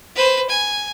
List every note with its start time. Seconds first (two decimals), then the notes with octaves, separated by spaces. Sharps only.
0.16 B4 C5
0.49 G#5